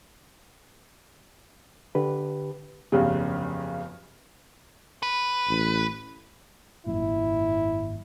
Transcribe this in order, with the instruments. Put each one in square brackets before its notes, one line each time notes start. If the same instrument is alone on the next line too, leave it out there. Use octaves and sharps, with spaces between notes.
[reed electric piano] D3 G4 B4
[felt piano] F1 B1 G2 C#3
[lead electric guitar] B4
[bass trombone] A1
[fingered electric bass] G#1 F#2 A#2 [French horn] E4